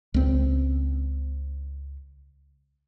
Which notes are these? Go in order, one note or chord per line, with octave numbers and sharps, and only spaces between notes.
C#2 C4